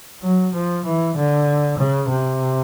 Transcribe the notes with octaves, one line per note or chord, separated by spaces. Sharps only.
F#3
F3
E3
D3
C#3
C3